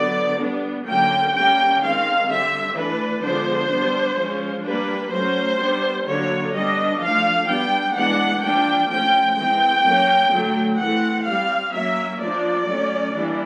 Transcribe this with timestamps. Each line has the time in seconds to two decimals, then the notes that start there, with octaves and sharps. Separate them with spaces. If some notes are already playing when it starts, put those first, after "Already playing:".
Already playing: D3 F#3 B3 D5
0.39 G3 B3 D4
0.86 D3 F#3 A#3 C#4 G5
1.33 G3 A#3 C#4 G5
1.81 D#3 G#3 C4 F5
2.28 D3 G3 C4 E5
2.74 E3 A3 D4 B4
3.22 D3 F3 G#3 B3 D4 C5
3.69 G3 B3 D4
4.16 F3 G#3 C#4
4.63 G3 A#3 D4 B4
5.11 F#3 A3 C#4 C5
5.58 G3 B3 D4
6.05 D3 F#3 A#3 D4 C#5
6.53 G3 B3 D4 D#5
7.00 F3 A3 D4 F5
7.47 G3 B3 D4 G5
7.95 E3 G#3 B3 D4 F#5
8.42 F3 A#3 D4 G5
8.89 F3 A3 C#4 G5
9.35 E3 G#3 C4 G5
9.83 F#3 A#3 C#4
10.30 D3 F#3 A3
10.78 E3 A3 C4 F#5
11.24 G3 C4 F5
11.71 F#3 A#3 C#4 E5
12.19 F3 A#3 D4 D5
12.67 F#3 A3 C#4
13.13 E3 G3 A#3 D4